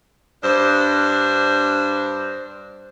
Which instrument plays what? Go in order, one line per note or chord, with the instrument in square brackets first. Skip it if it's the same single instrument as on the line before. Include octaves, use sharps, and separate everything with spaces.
[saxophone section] G2 D4 C5